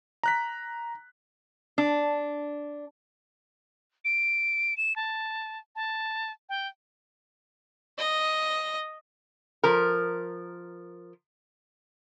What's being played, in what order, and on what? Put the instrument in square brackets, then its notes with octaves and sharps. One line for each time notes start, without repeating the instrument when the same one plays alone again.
[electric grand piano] A#5 F#6 B6
[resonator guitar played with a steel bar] D4
[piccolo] D7
E7
A5
A5
G5
[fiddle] D#5
[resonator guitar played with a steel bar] F3 A#4